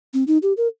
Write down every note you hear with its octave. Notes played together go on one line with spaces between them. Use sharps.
C4
D#4
G4
A#4